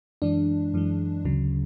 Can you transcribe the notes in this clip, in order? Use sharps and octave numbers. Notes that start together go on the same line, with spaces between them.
F#2 E3 G#3 D4
F#2 E3 G#3
D2 C#3 F#3